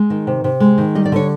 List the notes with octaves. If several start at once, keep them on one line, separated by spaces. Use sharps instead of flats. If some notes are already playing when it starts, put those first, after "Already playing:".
Already playing: G#3
D#3
C3
C3
G#3
D#3
G3 D#5
D5
D3 C#5